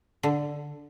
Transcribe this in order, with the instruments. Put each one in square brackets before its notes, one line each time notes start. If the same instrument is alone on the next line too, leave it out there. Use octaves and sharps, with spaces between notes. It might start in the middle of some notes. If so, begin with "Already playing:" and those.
[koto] D3